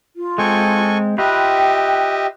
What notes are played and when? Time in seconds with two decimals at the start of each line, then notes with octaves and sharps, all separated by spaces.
0.16 F4
0.38 G#3 C4 A4 G#5 C#6
1.18 F4 G4 B4 D#5 E5 G5